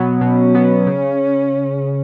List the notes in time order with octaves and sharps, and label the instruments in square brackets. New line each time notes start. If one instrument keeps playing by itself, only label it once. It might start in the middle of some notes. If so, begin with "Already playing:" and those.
Already playing: [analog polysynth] B2 F#3 B3
[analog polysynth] B2 [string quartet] C#4
[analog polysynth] F#3 B3
C#3